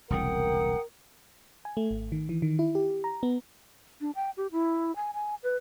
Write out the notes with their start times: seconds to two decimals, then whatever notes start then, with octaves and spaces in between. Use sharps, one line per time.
0.10 E1 C2 C#3 A#4 F#5 G5 D#6
1.65 G#5
1.77 A3
1.91 G#1
2.12 D#3
2.29 E3
2.42 D#3
2.59 E4
2.75 G4
3.04 A#5
3.23 B3
4.01 D4
4.15 G5
4.37 G4
4.52 E4
4.96 G#5
5.14 G#5
5.43 B4